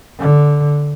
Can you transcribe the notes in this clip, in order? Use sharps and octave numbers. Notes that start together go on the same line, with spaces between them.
D3